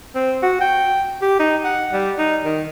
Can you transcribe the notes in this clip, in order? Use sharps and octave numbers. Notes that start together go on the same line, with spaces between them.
C4
F#4
G5
G4
D#4
F#5
G3
D#4
D#3